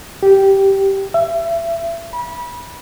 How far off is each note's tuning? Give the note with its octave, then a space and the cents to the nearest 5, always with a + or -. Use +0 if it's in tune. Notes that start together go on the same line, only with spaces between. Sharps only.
G4 -10
E5 +30
B5 -25